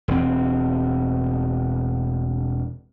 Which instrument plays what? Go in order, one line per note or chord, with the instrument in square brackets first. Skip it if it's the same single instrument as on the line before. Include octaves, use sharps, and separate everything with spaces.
[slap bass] E1 C4